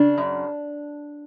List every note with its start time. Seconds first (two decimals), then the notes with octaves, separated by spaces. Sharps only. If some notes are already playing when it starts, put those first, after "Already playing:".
Already playing: C#3 D4
0.18 F#2